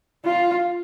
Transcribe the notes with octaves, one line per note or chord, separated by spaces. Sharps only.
F4